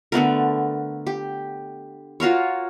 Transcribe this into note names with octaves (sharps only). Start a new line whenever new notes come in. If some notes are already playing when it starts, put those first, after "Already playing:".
D3 A3 B3 A#4
G4
F4 F#4 A#4 C#5